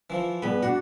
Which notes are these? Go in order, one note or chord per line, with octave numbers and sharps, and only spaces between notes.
E3 F3
G2 B3 G#4 B4
D4 F#4 F#5